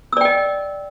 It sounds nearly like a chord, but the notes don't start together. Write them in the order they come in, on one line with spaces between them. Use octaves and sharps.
E6 D5 G5 D#5